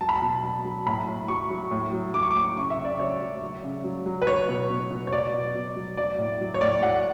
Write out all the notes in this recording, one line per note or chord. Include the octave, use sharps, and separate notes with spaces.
F#3 A5
B5
A5
B2
F#3
F#3
A2 B5
A2
F#3 C#6
F#3
A2
F#3
F#3 D6
C#6
A2 D6
C#3 C#6
E5
C#3
D5
F#3 C#5
F#3
F#3
C#3
F#3
F#3
B4
F#3 C#5
B2
B2
B2
C#5
F#3 D5
B2
B2
F#3
F#3 D5
A2
F#3
C#5
A2 D5
F#3 F#5